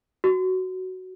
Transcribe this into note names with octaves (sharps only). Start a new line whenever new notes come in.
F#4